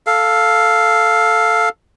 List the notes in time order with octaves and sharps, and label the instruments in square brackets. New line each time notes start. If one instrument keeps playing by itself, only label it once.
[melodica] A4 F5